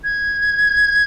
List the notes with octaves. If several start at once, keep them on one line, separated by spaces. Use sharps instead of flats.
G#6